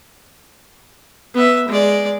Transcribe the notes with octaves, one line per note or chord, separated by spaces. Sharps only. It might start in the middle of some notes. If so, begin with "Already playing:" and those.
B3 E5
G#3 D5